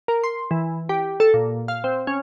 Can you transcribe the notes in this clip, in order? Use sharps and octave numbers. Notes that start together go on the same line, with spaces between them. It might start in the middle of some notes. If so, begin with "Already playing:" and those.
A#4
C6
E3
G4
A4
A#2
F5
C4
C#4